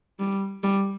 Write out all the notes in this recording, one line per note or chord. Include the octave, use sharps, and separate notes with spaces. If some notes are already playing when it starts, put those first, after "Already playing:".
G3
G3